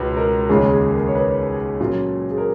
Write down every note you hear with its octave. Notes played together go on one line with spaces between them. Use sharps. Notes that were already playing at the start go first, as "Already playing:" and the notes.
Already playing: C#2 B2 B4
A#4
D#2 C#3 G#3 C#4 F4 G#4
G#4
A#4
C#5
B4
A#2 F#3 C#4 F4
G#4
A#4